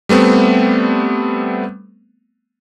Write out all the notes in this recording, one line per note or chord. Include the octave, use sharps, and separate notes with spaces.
G3 A3 B3 C4